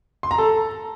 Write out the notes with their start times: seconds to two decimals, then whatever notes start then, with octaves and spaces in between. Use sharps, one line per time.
0.23 C6
0.31 A#5
0.38 A4